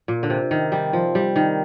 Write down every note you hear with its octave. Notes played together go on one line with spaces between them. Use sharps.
A#2
D3
C3
D#3
G3
F3
G3
D#3